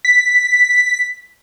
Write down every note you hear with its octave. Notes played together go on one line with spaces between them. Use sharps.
B6